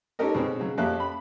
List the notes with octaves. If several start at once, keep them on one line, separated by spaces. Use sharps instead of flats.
C#4 D#4 G4 A4 A#4 D#5
B2 G#3 C4 C#4
C#3 F#3
F2 A#3 C#4 G4 E5 F#6
B5